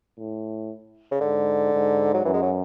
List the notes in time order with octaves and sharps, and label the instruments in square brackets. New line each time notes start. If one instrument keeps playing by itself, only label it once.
[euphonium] A2
[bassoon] C#3
[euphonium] G#2 [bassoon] D3
[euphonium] G#2
[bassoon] F#3
[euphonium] F#2 [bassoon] E3
[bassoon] G#3
F#3